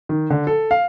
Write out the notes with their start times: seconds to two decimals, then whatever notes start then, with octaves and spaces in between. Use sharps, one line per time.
0.09 D#3
0.30 D3
0.47 A4
0.71 F5